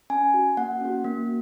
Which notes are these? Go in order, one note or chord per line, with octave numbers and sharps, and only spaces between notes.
C#4 G#5
F#4
A#3 F#5
C#4 F#4
A#3